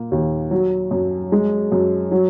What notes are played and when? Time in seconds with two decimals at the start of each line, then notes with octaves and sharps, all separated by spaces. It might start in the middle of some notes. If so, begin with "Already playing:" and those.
Already playing: A#2 A#3
0.11 D#2
0.51 F#3
0.91 F#2
1.32 G#3
1.72 F#2
2.11 F#3